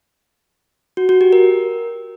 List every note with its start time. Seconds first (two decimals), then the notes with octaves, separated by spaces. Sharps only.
0.97 F#4
1.09 F#4
1.21 G4
1.33 A#4